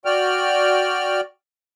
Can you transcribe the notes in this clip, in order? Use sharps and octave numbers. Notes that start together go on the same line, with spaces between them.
F#4 D5 G5 F6